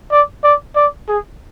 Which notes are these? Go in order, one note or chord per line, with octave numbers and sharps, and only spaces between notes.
D5
D5
D5
G#4